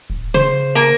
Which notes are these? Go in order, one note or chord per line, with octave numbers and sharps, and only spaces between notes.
D1
C#3 C5
A#3